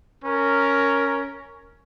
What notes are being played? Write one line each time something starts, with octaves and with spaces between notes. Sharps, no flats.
C#4 A#4